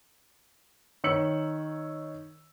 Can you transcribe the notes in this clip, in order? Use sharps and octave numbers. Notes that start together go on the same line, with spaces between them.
D#3 C#5 E6 C#7 F#7